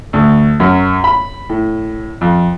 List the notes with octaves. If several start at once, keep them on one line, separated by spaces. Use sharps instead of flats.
D2
F#2
B5
A2
F2